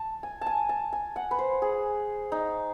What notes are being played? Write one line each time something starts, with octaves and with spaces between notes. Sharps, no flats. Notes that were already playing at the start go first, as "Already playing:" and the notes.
Already playing: A5
G#5
G#5 A5
A5
G#5
F#5
B4
C5
G#4
D#4